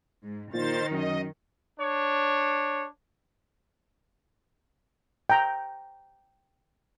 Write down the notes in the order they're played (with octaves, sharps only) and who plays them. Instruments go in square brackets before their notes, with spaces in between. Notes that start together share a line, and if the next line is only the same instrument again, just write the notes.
[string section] G#2
[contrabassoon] A#2 [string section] D#3 [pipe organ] C5 A6
[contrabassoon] F#2 [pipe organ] D#5
[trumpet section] D4 C#5
[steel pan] G5 A#5